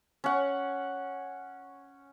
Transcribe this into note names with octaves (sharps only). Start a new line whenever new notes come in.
C#4 F#5